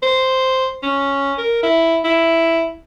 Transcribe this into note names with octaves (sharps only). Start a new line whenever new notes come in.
C5
C#4
A#4
E4
E4